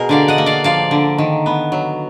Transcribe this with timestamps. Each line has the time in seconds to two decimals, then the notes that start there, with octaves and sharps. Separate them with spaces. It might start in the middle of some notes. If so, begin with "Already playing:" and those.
Already playing: B2 G#4 A#4
0.09 D3 D5 F5
0.28 D#5 F#5
0.38 A#3
0.46 D5 F5
0.64 F3 D5 F5
0.91 D3
1.18 D#3
1.46 B3
1.72 F#3